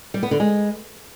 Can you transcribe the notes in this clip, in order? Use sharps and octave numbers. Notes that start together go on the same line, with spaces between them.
G3
B3
D3
G#3